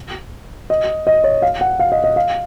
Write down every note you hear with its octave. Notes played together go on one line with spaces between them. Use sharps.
D#5
D#5
C#5
F5
F#5
F5
D#5
D#5
F5